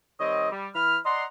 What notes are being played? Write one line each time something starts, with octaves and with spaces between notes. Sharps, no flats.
D#3 G3 C4 C#5 D#5
G3
E3 B5 F6
D5 D#5 F#5 A#5 C6